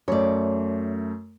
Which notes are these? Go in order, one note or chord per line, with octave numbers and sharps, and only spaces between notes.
F#2 A3 C#5 D5